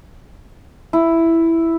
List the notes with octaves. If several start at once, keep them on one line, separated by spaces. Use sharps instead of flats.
E4